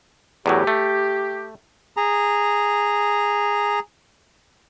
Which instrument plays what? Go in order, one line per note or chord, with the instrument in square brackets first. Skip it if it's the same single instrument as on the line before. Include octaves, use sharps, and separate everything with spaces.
[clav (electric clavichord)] E2 A2 F#3 [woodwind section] G4
[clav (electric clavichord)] A3
[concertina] G#4 A#5